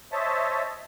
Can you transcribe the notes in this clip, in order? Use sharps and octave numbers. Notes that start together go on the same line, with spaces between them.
C5 C#5 D#5 E5 A5